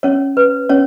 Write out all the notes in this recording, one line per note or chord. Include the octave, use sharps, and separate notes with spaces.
C#4 C#5
B4
C#4 C#5